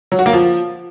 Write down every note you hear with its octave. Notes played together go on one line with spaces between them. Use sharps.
F#3
F#4
A#3
F3